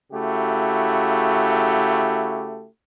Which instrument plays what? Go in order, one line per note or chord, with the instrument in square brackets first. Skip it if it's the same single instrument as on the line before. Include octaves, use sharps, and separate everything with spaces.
[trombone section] C#3 A3 E4 F#4 G4